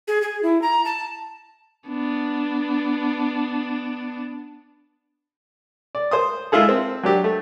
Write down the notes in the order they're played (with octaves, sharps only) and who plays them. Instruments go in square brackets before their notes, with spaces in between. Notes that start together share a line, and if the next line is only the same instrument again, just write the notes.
[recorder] G#4
G#4
E4
A#5
A5
[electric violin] B3 D4
[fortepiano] D5
C5 C6 D#6
G#3 E4 F4 G#4 A4
C4
F#3 D4 G4
A3